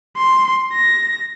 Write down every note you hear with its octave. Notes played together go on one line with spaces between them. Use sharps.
C6
A#6